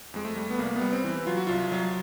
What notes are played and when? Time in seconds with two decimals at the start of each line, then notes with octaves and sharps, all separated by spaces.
0.14 F2 G#3
0.25 A3
0.36 G3
0.50 B3
0.59 C2 A#3
0.76 B3
0.81 G3
0.93 C4
1.04 E3
1.10 E4
1.27 F#3 F4
1.37 F#4
1.47 C2 F4
1.72 F#3